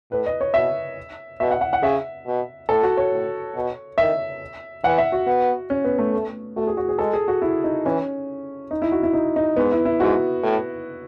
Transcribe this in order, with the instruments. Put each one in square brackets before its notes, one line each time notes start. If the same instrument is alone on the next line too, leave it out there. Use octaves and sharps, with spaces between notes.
[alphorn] A2 [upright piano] B4
[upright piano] D#5
C#5
[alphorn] B2 [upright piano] E5
[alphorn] B2 [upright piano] E5
[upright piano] F#5
F#5
F#5
[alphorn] C#3 [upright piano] E5
[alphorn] B2
[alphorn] A2 [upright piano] A4
[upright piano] F#4
C#5
[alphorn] A2
B2
[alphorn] D#3 [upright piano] E5
[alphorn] E3 [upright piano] F#5
[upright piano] E5
F#4
[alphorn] B3
[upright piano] C#4
B3
A3
[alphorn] A3
[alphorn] A3 [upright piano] F#4
[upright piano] G#4
F#4
G#4
[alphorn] G#3 [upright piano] A4
[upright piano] G#4
F#4
E4
D#4
[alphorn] E3 [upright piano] C#4
[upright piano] D#4
E4
F#4
E4
D#4
D#4
[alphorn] G#2 [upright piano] B3
[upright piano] E4
E4
[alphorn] G#2 [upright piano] F#4
[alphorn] A2